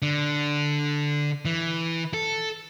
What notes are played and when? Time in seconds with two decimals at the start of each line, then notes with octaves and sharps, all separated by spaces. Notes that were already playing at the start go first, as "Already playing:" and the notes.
0.02 D3
1.45 E3
2.14 A4